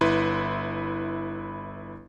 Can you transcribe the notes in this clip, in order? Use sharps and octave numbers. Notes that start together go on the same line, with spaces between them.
G1 E4 B4 C6